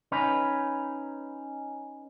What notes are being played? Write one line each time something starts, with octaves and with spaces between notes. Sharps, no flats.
C#4 D#4 B4